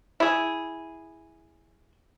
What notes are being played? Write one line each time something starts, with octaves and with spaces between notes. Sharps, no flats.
E4 G#4